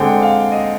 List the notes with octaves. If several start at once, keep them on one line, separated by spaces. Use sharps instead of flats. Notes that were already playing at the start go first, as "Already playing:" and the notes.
Already playing: D3 G#3 C4 G5
F5
D#5